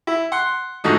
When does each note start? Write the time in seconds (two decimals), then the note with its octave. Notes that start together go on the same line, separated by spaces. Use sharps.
0.07 E4
0.32 F#5 C6
0.84 G#2 D3 F3 A3 D#4 F#4